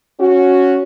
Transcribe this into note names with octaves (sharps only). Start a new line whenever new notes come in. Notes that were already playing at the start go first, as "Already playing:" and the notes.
C#4 F#4